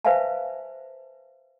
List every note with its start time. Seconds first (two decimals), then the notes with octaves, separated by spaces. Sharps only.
0.05 B4 C5 E5 F5 G#5 A5